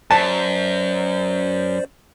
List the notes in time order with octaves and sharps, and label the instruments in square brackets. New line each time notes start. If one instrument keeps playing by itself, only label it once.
[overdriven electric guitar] F#2 [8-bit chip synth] C5 D5 [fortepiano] A5